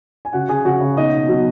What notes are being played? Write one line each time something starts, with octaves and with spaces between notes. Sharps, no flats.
G#5
C#3 F#4 F#5
C#3 G#4 G#5
C#3 F#4 F#5
C#3
B2 D#4 D#5
B2
B2 F#3 F#4